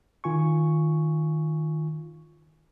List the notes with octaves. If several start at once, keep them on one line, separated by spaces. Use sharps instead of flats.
D#3 F4 G#5 C#6